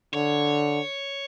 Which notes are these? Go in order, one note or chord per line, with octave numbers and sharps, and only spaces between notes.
D3 C#5